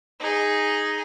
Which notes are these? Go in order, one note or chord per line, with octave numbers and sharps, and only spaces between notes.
D#4 G#4